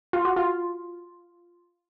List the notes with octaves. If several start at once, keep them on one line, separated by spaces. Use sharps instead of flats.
F4
F#4
F4